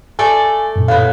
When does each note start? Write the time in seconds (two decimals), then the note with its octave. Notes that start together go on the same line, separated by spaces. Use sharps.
0.19 A3 A4 D5 G#5
0.76 F#2 A#2
0.88 A2 B3 F5